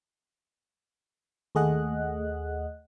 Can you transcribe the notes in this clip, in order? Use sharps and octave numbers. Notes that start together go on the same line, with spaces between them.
D#2 A3 G#4 D#5 F#5 F#6